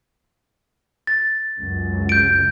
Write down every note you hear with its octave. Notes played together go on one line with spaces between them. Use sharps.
A6
C#2 F#2
G6 D7